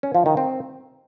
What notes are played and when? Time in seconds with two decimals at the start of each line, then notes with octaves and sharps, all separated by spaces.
0.03 C#4
0.15 F3
0.26 D#3
0.37 C4